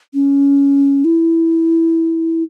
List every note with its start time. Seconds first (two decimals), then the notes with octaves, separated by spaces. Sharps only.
0.14 C#4
1.05 E4